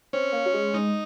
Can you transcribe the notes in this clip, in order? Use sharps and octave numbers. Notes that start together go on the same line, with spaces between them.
C4 C#4
A#3
F#3
G#3
G#3 D#4